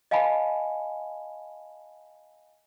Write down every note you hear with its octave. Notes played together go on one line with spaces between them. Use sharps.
D#5 F5 G#5 A5 B5